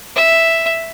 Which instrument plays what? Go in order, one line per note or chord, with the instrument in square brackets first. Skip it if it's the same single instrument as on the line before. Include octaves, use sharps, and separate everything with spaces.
[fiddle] E5